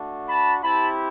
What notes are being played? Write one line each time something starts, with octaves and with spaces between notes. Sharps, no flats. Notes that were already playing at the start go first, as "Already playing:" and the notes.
Already playing: A3 D4 F#4
A5 B5
C4 E4 G4 A5 B5